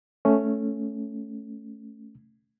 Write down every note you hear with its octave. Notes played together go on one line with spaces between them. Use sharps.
A3 C#4